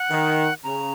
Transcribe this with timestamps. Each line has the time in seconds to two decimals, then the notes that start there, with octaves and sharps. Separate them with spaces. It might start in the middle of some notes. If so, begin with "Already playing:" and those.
Already playing: F#5
0.11 D#3
0.64 C#3 A#5